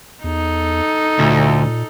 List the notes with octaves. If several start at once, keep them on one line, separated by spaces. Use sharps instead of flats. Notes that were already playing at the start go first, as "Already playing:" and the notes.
E2 D#4 A4
D2 A#2